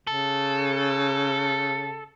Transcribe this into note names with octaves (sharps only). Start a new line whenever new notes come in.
C#3 A4